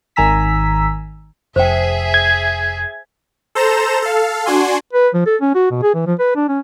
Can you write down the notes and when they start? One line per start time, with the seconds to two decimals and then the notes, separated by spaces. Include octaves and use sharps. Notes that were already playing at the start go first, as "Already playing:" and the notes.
0.16 G#1 D#3 G#5 A#5 E6 B6
1.56 F1 G#4 C5 E5 G5
2.14 G#6
3.55 A4 C5 A#5 E7
4.02 A4 F5
4.46 D4 F#4 G#5 C6
4.93 B4
5.14 F3
5.26 A4
5.41 C#4
5.55 F#4
5.71 B2
5.83 G#4
5.94 E3
6.07 F3
6.19 B4
6.36 D4
6.49 C#4